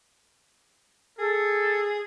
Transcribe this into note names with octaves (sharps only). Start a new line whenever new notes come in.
G#4 A4